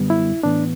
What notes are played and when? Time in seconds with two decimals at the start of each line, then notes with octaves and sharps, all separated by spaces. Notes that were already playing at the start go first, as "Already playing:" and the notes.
Already playing: F#2 D3 G3 B3
0.10 E4
0.43 A2 E3 B3 D4